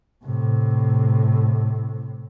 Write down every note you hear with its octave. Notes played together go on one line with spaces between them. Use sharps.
A2 C3